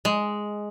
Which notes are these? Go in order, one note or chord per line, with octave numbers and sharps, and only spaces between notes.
G#3